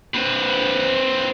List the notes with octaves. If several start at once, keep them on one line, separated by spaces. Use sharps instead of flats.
C4 B4